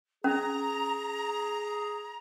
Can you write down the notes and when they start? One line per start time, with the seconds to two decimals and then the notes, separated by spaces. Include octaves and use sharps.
0.24 C#4 G#4 A#5